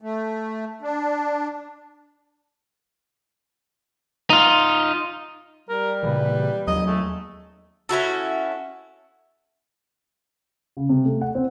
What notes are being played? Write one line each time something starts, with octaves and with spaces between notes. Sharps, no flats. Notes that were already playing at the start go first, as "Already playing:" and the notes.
A3
D4
D#4 F4
G3 A#4
A#2 C#3 E3 B4
D#2 F#3 D#5
G#3 A3
C#4 E4 F#4 A4
C#3
C3
A3
F#5
C4